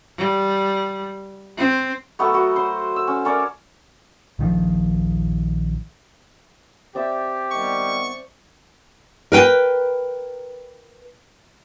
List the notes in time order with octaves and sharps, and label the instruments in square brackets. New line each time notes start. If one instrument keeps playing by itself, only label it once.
[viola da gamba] G3
C4
[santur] F#3 A3 B3 C#6
B3 F#4
C5 C6
E6
C#4
C#4 A#4 C#5 D5
[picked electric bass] A#1 D#3 F3
[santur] C4 D5 E5 [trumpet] G4
[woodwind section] D#3 G3 B3 [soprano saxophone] C#6
[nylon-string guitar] A#4 B4 G5